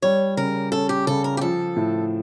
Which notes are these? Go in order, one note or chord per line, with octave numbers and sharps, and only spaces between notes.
G3 C#5
C#3 A#4
C#4 A4
G4
C#3 A4
A#4
G4
F3 A4
A2